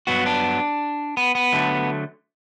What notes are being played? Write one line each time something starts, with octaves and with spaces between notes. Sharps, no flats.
G2 F#3 B3 F#4
D4
B3
B3
D3 F#3 A3